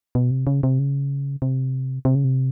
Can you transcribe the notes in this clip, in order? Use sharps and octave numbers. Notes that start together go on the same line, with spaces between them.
B2
C3
C#3
C3
C#3
C3
C3
C#3
C3